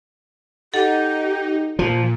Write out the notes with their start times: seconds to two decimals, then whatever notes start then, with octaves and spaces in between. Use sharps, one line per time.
0.74 D#4 G4 A4 F#5
1.79 A#2 F3